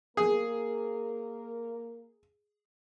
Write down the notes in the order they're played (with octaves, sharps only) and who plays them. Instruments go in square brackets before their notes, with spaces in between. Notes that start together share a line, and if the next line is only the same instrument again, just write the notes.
[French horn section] A#3 A#4 [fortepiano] G#4